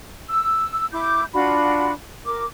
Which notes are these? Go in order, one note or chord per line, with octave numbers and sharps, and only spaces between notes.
E6
E4 D6 G6
D4 F4 F#4 B5
A#4 D6